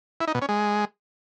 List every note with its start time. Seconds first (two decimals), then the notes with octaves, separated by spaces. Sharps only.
0.20 E4
0.28 D#4
0.35 B2
0.42 C#4
0.49 G#3